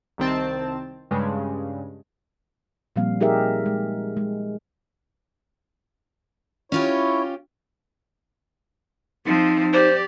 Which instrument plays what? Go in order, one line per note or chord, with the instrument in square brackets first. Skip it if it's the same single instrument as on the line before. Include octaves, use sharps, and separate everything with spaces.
[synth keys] C2 D#3 C4 A5
G2 C#3 G#3
[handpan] A#2 F3 G3 A#3 C4 F5
D#4 G4 G#4 A#4 E5
G#3
G#3
[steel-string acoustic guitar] C#4 F4 G4 [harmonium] E4 C#5
[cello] F3 C4 [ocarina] D#4
[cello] G4 D5 [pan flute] C5